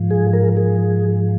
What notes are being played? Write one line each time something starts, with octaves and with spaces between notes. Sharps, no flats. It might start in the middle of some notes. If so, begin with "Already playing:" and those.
Already playing: G#2 F3
G#4
A#4
G#4